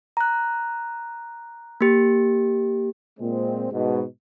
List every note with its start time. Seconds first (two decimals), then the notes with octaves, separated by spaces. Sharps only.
0.17 A#5 F#6
1.81 A#3 G4
3.19 A#2 G#3 C4
3.71 G#2 B2